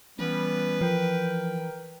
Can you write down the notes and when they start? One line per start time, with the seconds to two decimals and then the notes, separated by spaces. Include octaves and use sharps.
0.19 E3 G3 B3 C#4 B4
0.81 F3 A#4 G5